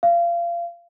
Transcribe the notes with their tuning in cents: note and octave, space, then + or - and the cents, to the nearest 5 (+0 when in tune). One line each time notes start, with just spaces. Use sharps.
F5 -30